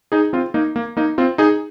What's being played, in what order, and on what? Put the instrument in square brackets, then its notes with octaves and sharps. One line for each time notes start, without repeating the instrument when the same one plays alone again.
[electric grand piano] D#4 G#4
C4 F4
A#3 D#4
A#3
A#3 D#4
C4 F4
D#4 G#4